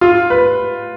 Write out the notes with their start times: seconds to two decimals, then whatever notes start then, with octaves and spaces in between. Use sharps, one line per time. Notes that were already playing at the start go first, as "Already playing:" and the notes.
0.01 F4
0.30 B4